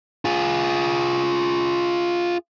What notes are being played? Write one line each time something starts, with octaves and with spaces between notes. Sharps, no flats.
F4 G#4